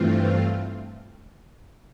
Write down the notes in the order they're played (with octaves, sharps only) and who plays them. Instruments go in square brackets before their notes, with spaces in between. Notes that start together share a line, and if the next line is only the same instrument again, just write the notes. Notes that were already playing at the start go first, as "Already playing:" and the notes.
Already playing: [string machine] G2 E3 A3 C4 F4